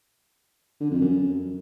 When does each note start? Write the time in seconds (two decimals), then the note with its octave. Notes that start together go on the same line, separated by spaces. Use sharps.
0.80 D3
0.91 F2
1.01 F#2